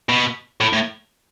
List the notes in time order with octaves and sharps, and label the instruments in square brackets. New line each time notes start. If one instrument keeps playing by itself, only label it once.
[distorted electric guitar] B2
A2
A2